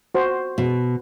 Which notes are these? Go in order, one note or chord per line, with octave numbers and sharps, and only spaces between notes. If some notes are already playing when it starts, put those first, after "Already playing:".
F#4 C5
B2